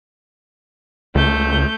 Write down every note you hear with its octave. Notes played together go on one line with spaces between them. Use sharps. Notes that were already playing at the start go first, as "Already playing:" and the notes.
C#2 A3 G6